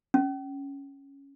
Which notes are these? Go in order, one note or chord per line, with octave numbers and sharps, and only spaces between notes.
C#4